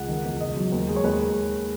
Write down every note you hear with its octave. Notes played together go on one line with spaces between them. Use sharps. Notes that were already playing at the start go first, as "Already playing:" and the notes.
Already playing: C#2 F#5
D#3
E2
C#2 D#5
F#3
D#2
G#3
C#5
D#2 B4
G#3